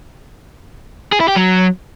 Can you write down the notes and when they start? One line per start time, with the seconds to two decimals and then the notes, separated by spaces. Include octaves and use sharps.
1.12 G#4
1.20 E4
1.28 G4
1.36 F#3